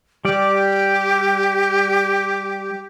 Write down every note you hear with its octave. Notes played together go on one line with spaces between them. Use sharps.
G3 G4 D5